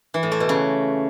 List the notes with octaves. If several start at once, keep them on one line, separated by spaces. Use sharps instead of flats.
E3
A2
A3
B2
C#3